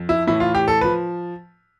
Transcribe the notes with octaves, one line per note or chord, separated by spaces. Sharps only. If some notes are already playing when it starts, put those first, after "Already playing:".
Already playing: F2
E4
A2 E3 E4
F4
G4
A4
F3 B4